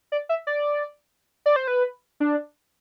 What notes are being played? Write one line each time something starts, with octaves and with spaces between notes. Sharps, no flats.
D5
E5
D5
D5
C5
B4
D4